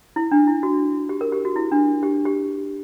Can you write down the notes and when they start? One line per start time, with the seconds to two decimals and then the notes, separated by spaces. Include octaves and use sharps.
0.16 E4
0.31 D4
0.47 E4
0.63 F#4
1.09 G4
1.21 A#4
1.32 G4
1.45 F#4
1.56 E4
1.72 D4
2.03 G4
2.25 G4